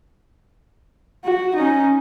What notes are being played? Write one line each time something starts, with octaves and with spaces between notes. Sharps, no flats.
F#4
C#4 D#4